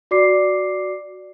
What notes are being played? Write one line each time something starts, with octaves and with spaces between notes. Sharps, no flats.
F#4 D5 D6 C7